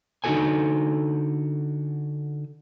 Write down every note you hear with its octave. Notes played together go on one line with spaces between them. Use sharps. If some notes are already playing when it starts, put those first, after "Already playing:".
D3 D#4 E4 F#4 A4 G#5